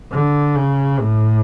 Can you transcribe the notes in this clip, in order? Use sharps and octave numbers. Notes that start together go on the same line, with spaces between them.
D3
C#3
A2